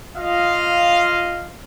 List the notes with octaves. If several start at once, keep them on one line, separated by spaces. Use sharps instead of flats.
F4 D#5 F5